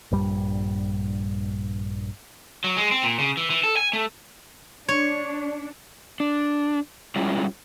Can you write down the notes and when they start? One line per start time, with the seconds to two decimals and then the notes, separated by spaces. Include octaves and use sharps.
0.11 A#1 G2 G3
2.64 F#3
2.77 G#3
2.91 C4
3.03 A#2
3.19 C#3
3.37 E3
3.50 E3
3.64 A4
3.77 G#5
3.93 A3
4.88 D4 C#5
6.20 D4
7.16 G3 G#3 C#4 E4 F4